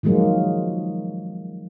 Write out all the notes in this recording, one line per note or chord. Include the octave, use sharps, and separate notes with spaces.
D#3 F3 F#3 G#3 A#3